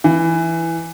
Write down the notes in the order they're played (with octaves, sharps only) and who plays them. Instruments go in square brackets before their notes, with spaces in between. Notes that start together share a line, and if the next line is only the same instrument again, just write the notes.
[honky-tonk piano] E3